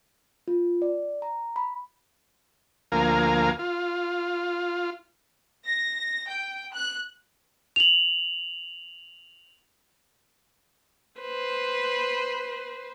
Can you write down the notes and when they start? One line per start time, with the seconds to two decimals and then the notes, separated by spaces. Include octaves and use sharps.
0.48 F4
0.82 D5
1.22 A#5
1.56 B5
2.92 D2 F3 A#3 A#4 F5 G#5
3.59 F4
5.66 A#6
6.27 G5
6.74 F#6
7.76 F7 F#7
11.21 B4 C5